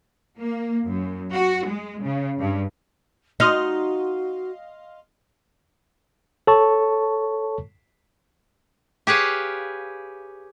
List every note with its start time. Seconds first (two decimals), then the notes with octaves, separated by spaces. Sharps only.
0.39 A#3
0.85 F#2
1.32 F#4
1.66 G#3
2.03 C#3
2.39 G2
3.40 D#4 F#4 D#5 F5 C6
6.47 A4 C#5 A5 C#6
9.07 G4 G#4 B4 C#5 F5